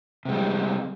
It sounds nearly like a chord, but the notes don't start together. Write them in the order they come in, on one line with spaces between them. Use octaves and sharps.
C3 G#3 G3